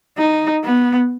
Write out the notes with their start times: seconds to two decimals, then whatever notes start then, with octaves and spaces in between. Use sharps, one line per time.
0.18 D#4
0.64 B3